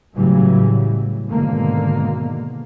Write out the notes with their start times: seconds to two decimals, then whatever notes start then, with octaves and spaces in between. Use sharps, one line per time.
0.15 A2 C#3 E3 F#3 G3
1.28 G#2 B2 D3 D#3 A#3